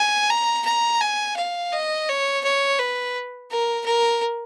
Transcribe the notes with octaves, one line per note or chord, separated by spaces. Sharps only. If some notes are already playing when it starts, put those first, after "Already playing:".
Already playing: G#5
A#5
A#5
G#5
F5
D#5
C#5
C#5
B4
A#4
A#4